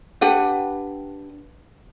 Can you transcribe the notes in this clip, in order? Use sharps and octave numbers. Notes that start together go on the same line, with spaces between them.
D4 G4 B4 F#5